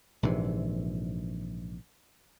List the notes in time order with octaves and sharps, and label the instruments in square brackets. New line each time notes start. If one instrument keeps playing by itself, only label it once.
[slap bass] A#1 G#2 C3 E3